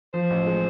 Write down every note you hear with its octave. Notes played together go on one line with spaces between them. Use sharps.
F3 C5
A1
G#3